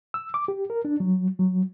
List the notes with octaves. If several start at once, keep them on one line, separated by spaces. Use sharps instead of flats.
E6
D6
G4
A#4
D4
F#3
F#3